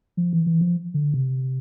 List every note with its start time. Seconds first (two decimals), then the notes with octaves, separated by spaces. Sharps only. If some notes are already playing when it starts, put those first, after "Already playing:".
0.17 F3
0.33 E3
0.47 E3
0.61 F3
0.94 D3
1.14 C3